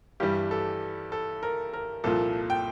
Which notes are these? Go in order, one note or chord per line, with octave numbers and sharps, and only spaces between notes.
G2 E3 G3 G4
A4
A4
A#4
A#4
C2 A#2 F3 A4
G5